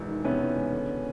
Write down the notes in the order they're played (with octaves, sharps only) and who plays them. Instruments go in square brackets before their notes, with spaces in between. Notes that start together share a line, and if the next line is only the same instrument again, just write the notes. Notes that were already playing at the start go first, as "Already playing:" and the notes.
Already playing: [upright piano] E1 E2 G#2
D#3
[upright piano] C3 [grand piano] B3 C#4
[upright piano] E2
E1
D3